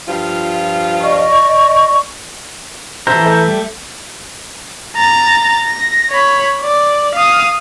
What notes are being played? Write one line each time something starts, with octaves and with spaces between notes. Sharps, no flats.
G2 F3 F4
D5 D#5 C#6
E3 A4 C5 E5 A#5 G6
A3
G3
A#5 A6
A#6
C#5 B5
D5
F5 D#6